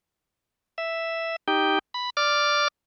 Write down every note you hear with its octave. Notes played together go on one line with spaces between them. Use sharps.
E5
D#4 G4 G5
B5
D5 D6 F6